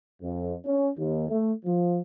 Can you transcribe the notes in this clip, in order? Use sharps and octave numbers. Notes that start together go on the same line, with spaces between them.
F2
C#4
D#2
A3
F3